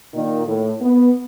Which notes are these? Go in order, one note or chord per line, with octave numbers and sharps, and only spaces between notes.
A#2 D#3
A2
B3